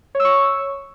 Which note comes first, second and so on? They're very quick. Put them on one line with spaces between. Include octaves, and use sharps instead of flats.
C#5 E6 C#6